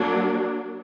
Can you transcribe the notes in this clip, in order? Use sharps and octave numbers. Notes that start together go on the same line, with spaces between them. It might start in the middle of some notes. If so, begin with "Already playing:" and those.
Already playing: F#3 A#3 D4